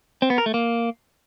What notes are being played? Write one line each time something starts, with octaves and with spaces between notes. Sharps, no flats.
C4
B3
A#4
A3
A#3